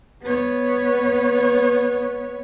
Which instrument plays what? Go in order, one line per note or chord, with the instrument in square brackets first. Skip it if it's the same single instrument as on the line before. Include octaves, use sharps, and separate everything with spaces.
[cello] B3 C#5